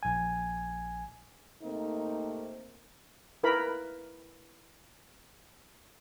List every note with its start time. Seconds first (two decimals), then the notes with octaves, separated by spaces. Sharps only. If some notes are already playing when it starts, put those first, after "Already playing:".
0.03 A#1 G#5
1.61 C3 A3 A#3 C4 D#4
3.43 E4 A#4 B4 B5